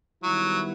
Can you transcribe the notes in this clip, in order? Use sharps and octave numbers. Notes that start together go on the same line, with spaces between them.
D#3 F#3 G3 B3 E4